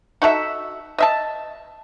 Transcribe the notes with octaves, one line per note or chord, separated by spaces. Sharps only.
D#4 F#4 A4 E5
D#5 E5 A5